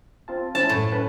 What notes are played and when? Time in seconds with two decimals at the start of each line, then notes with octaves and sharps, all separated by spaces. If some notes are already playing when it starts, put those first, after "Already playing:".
0.28 C4 F4 A5
0.55 C#4 E4 C5 A5
0.69 F#2 A2
0.92 C#4 B4 A5